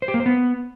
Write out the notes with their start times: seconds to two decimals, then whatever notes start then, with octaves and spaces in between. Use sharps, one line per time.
0.02 C5
0.08 G4
0.14 A#3
0.20 C5
0.26 B3